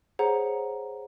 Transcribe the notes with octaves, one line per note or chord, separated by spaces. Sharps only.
G#4 C5 C#5 F#5 A#5